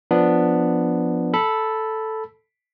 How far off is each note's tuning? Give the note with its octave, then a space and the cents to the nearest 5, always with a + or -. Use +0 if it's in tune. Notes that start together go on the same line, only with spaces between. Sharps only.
F3 +0 B3 +0 D4 +0
A4 +0 B5 -5